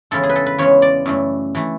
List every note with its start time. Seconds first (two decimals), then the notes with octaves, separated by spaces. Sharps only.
0.11 E2 C#3 E3 G#3 A4
0.23 G#4
0.30 B4
0.36 A4
0.46 B4
0.58 E2 C#3 E3 G#3 C#5
0.82 D5
1.06 F#2 E3 A3
1.55 E3 A3